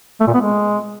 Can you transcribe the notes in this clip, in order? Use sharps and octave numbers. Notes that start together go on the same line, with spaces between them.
A3
A#2
B3
G#3